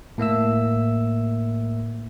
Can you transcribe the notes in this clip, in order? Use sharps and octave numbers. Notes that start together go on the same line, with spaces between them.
A2 A#3 E5 E6